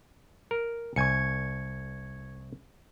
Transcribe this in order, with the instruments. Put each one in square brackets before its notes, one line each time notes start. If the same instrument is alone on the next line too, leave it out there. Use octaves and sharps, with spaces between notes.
[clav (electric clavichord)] A#4
[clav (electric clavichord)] C2 G#5 [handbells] C#6 G#6 C#7